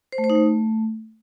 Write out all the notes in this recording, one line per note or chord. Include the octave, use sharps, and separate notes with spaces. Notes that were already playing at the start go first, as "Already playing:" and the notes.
C5
A3
C5
D#4
A3